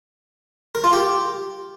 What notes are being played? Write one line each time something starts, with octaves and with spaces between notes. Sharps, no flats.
A#4
F4
G4